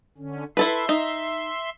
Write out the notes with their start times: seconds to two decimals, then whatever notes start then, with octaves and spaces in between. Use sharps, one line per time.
0.18 D3 C#4
0.57 E4 A4 B4 E5 C6
0.89 D#4